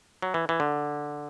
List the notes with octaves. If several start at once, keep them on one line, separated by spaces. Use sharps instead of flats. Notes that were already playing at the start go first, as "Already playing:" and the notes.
F#3
E3
E3
D3